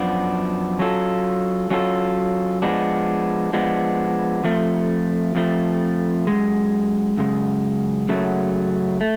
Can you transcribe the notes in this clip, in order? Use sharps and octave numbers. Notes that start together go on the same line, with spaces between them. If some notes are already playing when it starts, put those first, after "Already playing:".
Already playing: F#2 F3 B3 D4
F#3 C#4 F4 A4
F#3 C#4 F4 A4
F3 G#3 B3 D4
F3 G#3 B3 D4
F2 F3 A3
F2 F3 A3
F#2 C#3 G#3
F#2 C#3 G#3
F#2 C#3 F#3 A3
A3